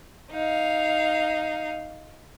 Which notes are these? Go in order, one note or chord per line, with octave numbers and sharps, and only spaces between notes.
D#4 F5